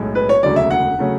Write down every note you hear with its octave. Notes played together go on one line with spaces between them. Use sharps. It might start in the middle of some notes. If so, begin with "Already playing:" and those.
Already playing: B1 A2 G#3
B4
C#5
E1 D2 C#3 F#3 D5
E5
F#5
C#3 F#3 A3